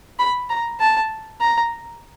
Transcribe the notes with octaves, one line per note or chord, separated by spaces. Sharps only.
B5
A#5
A5
A#5